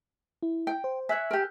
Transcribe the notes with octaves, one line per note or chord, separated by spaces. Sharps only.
E4
G5
C5
C#5 E5 G#5 E6 F#6
G4 A#4